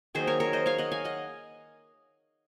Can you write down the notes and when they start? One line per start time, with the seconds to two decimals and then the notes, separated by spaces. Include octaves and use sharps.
0.15 D#3 F#3 A#3 G#4 C5
0.27 A#4 C#5
0.40 A#4 C#5
0.53 C5 D#5
0.66 C#5 F5
0.78 D#5 F#5
0.92 F5 G#5
1.05 D#5 F#5